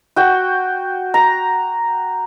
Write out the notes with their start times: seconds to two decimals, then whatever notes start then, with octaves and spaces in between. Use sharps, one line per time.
0.16 F#4 G5
1.14 A#5